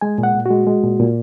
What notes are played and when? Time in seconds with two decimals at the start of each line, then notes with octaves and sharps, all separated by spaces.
0.01 G#3 G#5
0.18 A#2
0.23 F#5
0.35 A#2
0.46 F#4
0.51 G#3
0.67 G#3
0.83 A#2
1.00 A#2